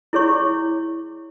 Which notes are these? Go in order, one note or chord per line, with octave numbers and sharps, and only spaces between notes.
E4 G#4 C#5 C#6